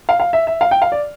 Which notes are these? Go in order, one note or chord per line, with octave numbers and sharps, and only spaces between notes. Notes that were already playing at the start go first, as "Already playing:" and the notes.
F5
F5
E5
E5
F5
G5
F5
D5